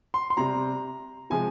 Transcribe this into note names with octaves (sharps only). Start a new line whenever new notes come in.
C6
C6
C3 G3 A#5
C3 F3 G#3 G#5